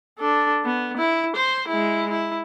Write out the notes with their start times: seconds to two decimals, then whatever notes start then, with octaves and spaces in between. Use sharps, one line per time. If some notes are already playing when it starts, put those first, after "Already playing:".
0.19 D4 A4
0.65 B3
0.98 E4
1.36 C5
1.68 G#3 E4
2.11 E4